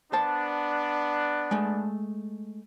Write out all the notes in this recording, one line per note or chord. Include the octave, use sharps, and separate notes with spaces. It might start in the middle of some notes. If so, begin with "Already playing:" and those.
B3 D4 C5 A5
G#3 A3